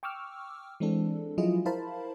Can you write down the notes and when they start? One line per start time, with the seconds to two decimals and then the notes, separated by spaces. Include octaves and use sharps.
0.03 G5 C#6 D6 E6 F6
0.80 E3 G#3 C4 D4 A4
1.38 F3 F#3 E4 F4 G#4 D#5
1.65 E4 A#4 C5 F5 A5 B5